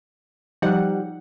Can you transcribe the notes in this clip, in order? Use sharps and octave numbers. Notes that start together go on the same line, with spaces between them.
F3 G3 D#4 F#5